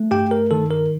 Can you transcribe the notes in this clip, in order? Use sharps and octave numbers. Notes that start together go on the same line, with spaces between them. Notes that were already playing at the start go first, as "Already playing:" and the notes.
Already playing: A3
G2 G4 G5
A#4
D#3 A4
A#4